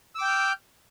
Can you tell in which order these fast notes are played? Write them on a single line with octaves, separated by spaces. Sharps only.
E6 D6 G5 G6 F6